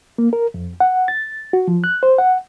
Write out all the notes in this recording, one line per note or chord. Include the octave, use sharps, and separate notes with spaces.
A#3
A#4
F2
F#5
A6
F#4
F3
F#6
C5
F#5